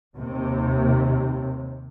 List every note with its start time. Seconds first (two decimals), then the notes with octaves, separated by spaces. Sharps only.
0.16 D#2 C3